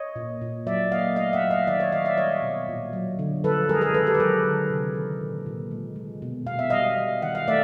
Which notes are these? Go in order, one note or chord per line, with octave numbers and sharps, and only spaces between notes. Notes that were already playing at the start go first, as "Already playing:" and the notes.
Already playing: C#5 D#5
A#2
A#2
F#3 D5 E5
A#3 D#5 F5
A3 D#5 F5
E5 F#5
F#3
D#5 F5
D#3 D5 E5
C#5 D#5
D#3 D#5 F5
D5 E5
G3 C#5 D#5
B2
A#2
F#3
D3
F3 A4 B4
G#3 G#4 A#4
G#4 A#4
D#3 A4 B4
G4 A4
B4
F#3 G#4 A#4
D3
C3
D#3
A#2
A#2
G#3
G#3
B2
B2 F5
E5
G3 D#5 F5
G3
D#3 F#5
F5
A3 D5 E5